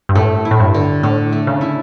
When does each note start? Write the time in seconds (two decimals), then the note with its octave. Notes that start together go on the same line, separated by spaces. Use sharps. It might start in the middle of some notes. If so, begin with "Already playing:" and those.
0.09 G2
0.15 A2 A3
0.45 E4
0.51 A2
0.60 G2
0.74 D3
1.03 A2 D3
1.32 A3
1.47 C#3
1.61 E4